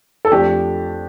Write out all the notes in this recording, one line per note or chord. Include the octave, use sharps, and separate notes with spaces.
A4
F2 F3 A3 D4 G4